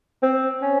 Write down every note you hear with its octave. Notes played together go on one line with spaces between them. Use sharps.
C4
C#4